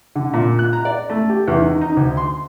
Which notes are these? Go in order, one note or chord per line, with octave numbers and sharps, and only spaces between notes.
D3
A#2
F#6
A#5
D5
A3
G4
E2
D#3
D#4
D2
C6